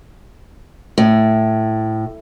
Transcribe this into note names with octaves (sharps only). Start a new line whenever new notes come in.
A2